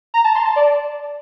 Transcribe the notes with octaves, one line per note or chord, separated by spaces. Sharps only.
A#5
A5
C6
A5
D5